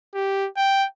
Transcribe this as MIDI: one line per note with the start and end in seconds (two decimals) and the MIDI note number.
0.14 0.47 67
0.57 0.85 79